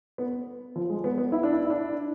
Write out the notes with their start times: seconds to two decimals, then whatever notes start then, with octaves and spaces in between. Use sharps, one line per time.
0.18 B3
0.76 F3
0.90 G#3
1.04 B3
1.18 B3
1.32 E4
1.43 D4
1.52 E4
1.65 E4
1.70 D4